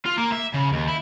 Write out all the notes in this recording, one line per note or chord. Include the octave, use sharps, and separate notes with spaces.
F4
A#3
E5
C#3
D#2
E4